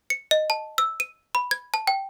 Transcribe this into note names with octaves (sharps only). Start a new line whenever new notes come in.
C#7
D#5
A5
E6
D#7
B5
G#6
A5
G5